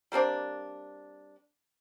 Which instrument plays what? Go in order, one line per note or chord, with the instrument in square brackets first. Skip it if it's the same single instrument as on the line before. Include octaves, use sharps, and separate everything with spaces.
[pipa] G3 A#3 C4 D4